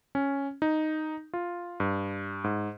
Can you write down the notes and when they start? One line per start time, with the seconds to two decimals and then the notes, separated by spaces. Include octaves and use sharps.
0.15 C#4
0.62 D#4
1.33 F4
1.80 G2
2.44 G#2